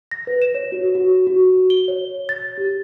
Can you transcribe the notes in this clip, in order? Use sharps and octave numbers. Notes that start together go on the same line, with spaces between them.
A#6
B4
E7
C#5
F#4
F#4
F#4
G7
C#5
A6
G4